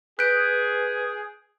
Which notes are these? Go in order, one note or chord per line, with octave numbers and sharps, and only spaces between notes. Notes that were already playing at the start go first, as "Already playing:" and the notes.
G#4 B4 F#6 G6 D7